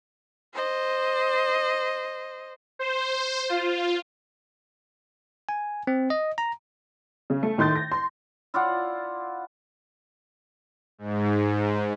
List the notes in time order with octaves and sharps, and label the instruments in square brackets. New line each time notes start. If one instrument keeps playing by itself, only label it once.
[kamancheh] C5 D#5
[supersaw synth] C5
F4
[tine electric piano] G#5
C4
D#5
A#5
[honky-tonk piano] C#3
A3
A2 D#3 C6 G6 A6
A#6
C6
[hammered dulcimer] E4 F4 D5 F#5
[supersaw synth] G#2